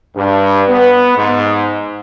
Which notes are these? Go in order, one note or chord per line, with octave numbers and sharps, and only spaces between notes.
G2
B3
G#2